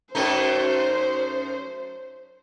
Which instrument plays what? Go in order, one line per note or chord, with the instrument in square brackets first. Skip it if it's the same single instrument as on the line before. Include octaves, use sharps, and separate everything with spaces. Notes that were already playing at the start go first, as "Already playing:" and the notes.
[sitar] F#2 A3 D#4 [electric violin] C5